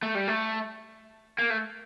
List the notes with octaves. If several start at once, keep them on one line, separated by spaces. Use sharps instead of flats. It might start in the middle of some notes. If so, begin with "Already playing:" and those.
A3
G3
A3
A#3
A3